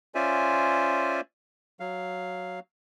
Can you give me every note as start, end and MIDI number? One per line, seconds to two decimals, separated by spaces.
0.15 1.21 61
0.15 1.21 65
0.15 1.21 72
0.15 1.21 74
0.15 1.21 76
0.15 1.21 80
1.80 2.60 54
1.80 2.60 77